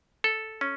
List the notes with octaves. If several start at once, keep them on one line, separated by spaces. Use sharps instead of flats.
A4
C#4